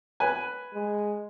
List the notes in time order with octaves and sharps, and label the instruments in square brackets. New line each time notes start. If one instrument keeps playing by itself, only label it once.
[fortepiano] B4 G#5
[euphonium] G#3